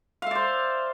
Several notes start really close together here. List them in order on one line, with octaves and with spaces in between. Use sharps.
F5 E5 D5 C5